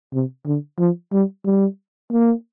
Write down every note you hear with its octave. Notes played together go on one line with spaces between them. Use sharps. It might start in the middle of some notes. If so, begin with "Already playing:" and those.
C3
D3
F3
G3
G3
A#3